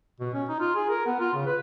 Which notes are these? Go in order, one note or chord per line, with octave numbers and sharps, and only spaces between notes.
B2
C#4
D#4
F4
G#4
A#4
B3
F4
C#3
B4